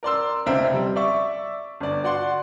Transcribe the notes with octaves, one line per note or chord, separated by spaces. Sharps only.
A#4 D5 C6 E6
F1 C#2 C4 E5 A#5
G3
D5 E5 C#6
G1 D5
F#4 D5 F#5 C6